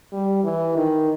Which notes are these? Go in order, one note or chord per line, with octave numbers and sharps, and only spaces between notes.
G3
E3
D#3